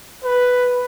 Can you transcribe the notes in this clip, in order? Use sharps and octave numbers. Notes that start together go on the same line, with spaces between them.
B4